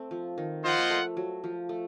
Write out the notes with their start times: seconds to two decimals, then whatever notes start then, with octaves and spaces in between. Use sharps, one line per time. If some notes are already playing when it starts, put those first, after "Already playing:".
Already playing: A3 C4
0.11 F3
0.38 D#3
0.64 F3 F4 C5 D#5 F#5
0.79 A#3
0.90 A3
1.17 F#3
1.44 F3
1.69 A3